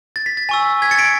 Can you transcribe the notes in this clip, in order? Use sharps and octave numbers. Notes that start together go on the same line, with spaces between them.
A6
B6
A6
G#5 C#6 E6
G#6 B6
A6 C#7
B6 D7